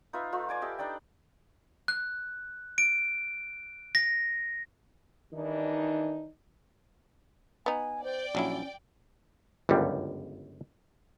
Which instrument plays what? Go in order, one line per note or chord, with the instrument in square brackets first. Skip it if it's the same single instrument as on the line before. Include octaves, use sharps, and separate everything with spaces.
[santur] D#4 F4 B4 E5
A3 D#4 F4
D5 G#5 D6
G4 A4 D#5 E5
D4 D#4 D5 G5
[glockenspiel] F#6
D7
A#6
[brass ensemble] D#3 E3 G3 D4 D#4
[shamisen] B3 D#4 [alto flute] G#5
[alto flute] C5 [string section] D5 G5
[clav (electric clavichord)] A#1 F#3 E4 [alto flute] C#4
[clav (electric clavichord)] G1 C#2 F#2 G3